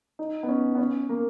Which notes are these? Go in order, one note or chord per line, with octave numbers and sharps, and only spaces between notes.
D#4
B3
C#4
B3
C#4
A#3